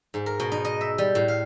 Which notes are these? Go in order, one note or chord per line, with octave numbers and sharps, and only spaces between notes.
G#2
A#4
B2
D#4
D#5
E5
G3
A2
F5